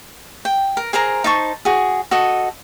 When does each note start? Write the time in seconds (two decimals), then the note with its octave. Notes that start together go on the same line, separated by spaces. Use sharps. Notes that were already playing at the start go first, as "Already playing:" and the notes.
0.45 G5
0.77 A#4
0.93 G#4 A#4 C5 A#5
1.24 D#4 C5 A5 C#6
1.65 F#4 G#4
2.11 F#4 A4 D#5